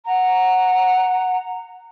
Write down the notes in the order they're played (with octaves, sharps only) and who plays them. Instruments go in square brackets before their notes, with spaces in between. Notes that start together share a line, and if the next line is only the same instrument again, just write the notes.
[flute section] F#5 A#5